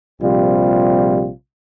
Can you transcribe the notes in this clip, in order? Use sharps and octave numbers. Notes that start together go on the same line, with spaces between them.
A#1 C3 G3 F4